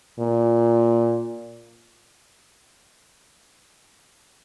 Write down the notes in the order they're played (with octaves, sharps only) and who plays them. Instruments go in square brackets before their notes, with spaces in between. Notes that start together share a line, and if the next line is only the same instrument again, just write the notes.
[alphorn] A#2